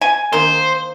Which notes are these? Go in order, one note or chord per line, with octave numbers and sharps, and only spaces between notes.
G#5
D#3 A#3 D#4 C5